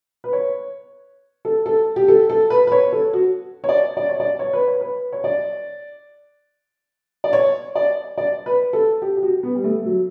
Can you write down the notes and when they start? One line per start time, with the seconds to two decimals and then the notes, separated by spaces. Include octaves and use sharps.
0.24 B4
0.33 C#5
1.45 A4
1.66 A4
1.96 G4
2.08 A4
2.30 A4
2.50 B4
2.67 B4
2.72 C#5
2.92 A4
3.13 F#4
3.64 C#5
3.69 D5
3.97 D5
4.09 C#5
4.20 D5
4.39 C#5
4.53 B4
4.67 C#5
4.81 B4
5.13 C#5
5.24 D5
7.24 D5
7.33 C#5
7.75 D5
8.18 D5
8.46 B4
8.73 A4
9.02 G4
9.17 G4
9.23 F#4
9.43 B3
9.55 G3
9.64 A3
9.85 F#3